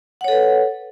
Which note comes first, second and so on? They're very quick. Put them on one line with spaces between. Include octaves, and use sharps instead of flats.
F#5 C#5 A4 B4